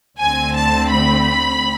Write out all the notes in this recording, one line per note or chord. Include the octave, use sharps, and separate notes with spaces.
D2 D3 A3 C4 G#5
A5
B5